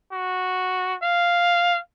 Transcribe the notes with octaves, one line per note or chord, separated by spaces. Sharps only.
F#4
F5